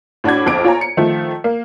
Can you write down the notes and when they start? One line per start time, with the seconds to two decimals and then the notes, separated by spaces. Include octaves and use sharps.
0.24 A2 D4 F#4 D6 G#6
0.46 A#1 F2 D6 D7
0.64 F4 C#5 G#5 A#5
0.81 C#7
0.97 D#3 F3 A3
1.44 A#3